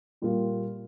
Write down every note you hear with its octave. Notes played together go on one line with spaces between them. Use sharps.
A#2 G3 A#3 F4